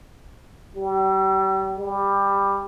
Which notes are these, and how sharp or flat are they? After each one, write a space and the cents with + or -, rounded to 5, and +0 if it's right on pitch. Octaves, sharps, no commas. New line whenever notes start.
G3 -35
G3 +15